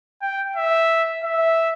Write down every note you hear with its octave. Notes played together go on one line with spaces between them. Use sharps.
G5
E5
E5